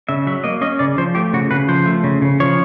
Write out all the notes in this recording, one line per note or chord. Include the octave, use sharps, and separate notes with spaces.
C#3 E5
F#3 E5
A#3 D#5
C#4 D#5
C#3 D5
F3 C5
A3 G4
C#3 F#4
C#3 B4
F3 C5
A3
C#3
C#3
F3 C#5